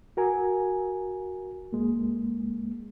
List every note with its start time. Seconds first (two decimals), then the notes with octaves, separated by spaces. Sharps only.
0.17 F#4 A#4 G#5
1.73 C#2 G#3 A#3